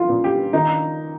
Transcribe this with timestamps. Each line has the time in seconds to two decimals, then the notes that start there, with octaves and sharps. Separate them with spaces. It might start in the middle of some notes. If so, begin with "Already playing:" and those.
Already playing: F3 F4
0.09 A#2
0.24 G4
0.53 D#3 D#4